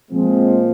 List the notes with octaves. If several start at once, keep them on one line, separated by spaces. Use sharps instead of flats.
A#2 F3 G#3 C4